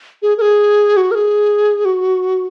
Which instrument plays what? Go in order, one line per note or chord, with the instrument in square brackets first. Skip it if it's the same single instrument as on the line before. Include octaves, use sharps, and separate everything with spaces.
[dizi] G#4
A#4
G#4
F#4
A#4
G#4
F#4